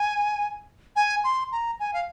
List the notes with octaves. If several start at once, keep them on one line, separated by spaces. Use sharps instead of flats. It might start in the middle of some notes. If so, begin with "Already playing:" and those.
Already playing: G#5
G#5
C6
A#5
G#5
F5